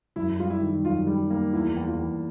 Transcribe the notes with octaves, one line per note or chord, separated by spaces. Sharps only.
F#2 E4
G3 F4
E4
D#3
F#2 F4
G3
A#3
E2 E4
E2
F4
E2